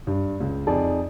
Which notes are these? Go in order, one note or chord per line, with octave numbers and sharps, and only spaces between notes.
G2
C#2
F2 D#4 G#4 D5 A5